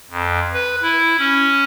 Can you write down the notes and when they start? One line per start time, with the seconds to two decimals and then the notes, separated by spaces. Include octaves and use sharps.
0.10 F2
0.53 B4
0.82 E4
1.19 C#4